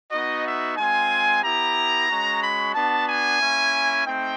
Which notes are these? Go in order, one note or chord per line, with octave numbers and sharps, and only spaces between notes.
B3 D#4 F#4 D#5
E5
G#3 C4 F4 G#5
B3 E4 G4 A#5
G#3 C#4 F#4
B5
B3 D4 F#4 A5
G#5
A#3 C#4 E4
A3 C4 D#4 G5